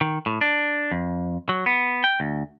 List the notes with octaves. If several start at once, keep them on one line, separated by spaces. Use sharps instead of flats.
D#3
A2
D4
F2
F#3
B3
G5
D2